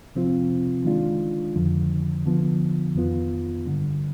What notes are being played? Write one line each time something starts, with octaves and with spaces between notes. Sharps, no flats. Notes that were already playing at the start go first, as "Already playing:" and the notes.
C3 F3 C4 F4
D#3 G#3 D4 F4
F2 D3 F3
D3 F3 B3
F2 D#3 B3 F4
G2 D3 G3